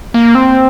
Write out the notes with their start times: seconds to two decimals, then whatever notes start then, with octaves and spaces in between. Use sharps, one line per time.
0.14 A#3
0.35 C4